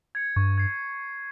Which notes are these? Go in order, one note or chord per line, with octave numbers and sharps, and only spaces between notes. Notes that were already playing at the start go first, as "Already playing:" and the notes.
G#6 C#7
G2 C#6
G#6 C7